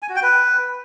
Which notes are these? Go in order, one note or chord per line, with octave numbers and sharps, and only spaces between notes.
G#5
F#4
G5
B4